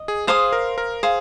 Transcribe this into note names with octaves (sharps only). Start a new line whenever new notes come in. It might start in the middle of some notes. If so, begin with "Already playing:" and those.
Already playing: D#5
G#4
G#4 C5 F5 C6 D#6
A#4
A#4
G#4 C5 F5